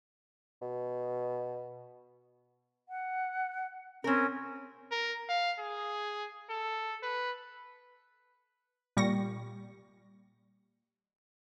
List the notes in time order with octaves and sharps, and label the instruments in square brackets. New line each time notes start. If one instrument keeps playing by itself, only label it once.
[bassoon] B2
[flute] F#5
[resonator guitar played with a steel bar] C4 A#4 [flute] C#4
[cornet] A#4
F5
G#4
A4
B4
[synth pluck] A#2 G3 C#6 A#6